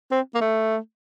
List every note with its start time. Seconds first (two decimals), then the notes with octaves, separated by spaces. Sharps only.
0.11 C4
0.35 A#3
0.41 A3